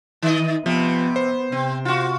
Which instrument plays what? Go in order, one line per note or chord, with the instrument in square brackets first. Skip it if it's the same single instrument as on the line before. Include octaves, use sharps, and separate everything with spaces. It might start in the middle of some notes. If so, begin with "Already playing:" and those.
[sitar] D#3 D#5
[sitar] C3 [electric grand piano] F3 [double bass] B3
[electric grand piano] C5
[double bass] C3 [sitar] C4
[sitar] F4 F#4